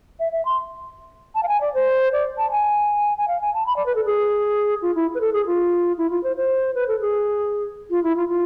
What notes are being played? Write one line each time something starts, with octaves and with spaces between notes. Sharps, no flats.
E5
E5
C6
A5
F5
G#5
D5
C5
D5
A5
G#5
G#5
F5
G#5
A5
B5
D5
B4
A4
G#4
F4
E4
B4
A4
G#4
F4
E4
F4
C5
C5
B4
A4
G#4
F4
E4
F4
F4